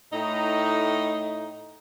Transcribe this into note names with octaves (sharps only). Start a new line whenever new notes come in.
A2 D#4